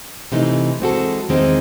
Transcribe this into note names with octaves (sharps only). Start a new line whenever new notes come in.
C3 E3 A3 D#4
E3 G#3 C4 F#4 A4
E2 D#3 G#3 C4 D#4